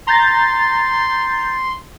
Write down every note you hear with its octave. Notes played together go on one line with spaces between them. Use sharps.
A#5 C6 G6 A6